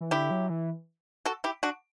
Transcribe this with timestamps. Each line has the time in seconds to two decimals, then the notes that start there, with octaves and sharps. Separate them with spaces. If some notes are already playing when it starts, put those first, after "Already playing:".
0.01 E3
0.11 D3 E4 G4
0.31 F#3
0.50 E3
1.25 F#4 A4
1.44 E4 G4
1.63 D4 F#4